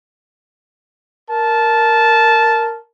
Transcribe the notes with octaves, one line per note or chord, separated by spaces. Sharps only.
A#4 A5